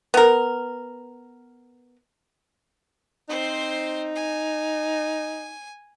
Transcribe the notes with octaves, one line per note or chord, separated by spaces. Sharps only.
B3 A#4
C4 D#4 C5
G#5